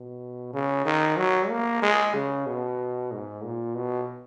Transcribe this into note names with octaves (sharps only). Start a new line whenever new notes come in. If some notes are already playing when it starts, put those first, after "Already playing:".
Already playing: B2
C#3
D#3
F#3
A#3
G#3
C#3
B2
G#2
A#2
B2